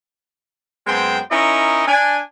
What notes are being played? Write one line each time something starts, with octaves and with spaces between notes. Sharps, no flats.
F#2 G#3 B3 C4 C5 G5
C#4 D#4 E4 A#4 C#5 D#5
D4 G#5